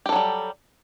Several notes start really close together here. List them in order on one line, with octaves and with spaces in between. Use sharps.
G4 A4 F#3 G3